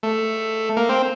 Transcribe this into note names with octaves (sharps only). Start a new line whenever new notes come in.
A3
A#3
C4